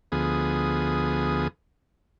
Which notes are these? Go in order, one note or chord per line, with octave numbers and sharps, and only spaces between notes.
D2 F3 B3 G#4 D#6